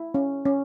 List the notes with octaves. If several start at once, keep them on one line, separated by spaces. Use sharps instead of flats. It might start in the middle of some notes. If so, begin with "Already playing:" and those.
Already playing: E4
C#4
C#4